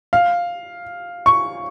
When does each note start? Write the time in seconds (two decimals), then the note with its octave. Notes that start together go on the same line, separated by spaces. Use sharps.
0.13 F5
1.26 C#6